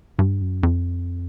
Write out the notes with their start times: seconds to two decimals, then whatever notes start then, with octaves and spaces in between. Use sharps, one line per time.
0.19 G2
0.41 F#2
0.63 F2